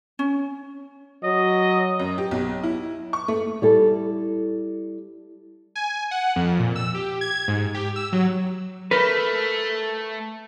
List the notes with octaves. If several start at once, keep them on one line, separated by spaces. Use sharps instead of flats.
C#4
F#3 D#5
F#2
G4
B1
E4
C#6
A3
G3 E4 A4
G#5
F#5
F2
A#2
E6
G4
G#6
G#2
G4
E6
F#3
A3 A#4 B4